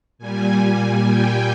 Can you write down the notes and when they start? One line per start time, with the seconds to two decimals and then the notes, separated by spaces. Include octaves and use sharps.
0.18 A#2 G3 G#5
1.08 G5